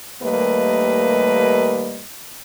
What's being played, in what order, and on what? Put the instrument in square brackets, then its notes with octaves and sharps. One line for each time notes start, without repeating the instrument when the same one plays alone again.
[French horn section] D#2 G3 A3 A#3 B4 D#5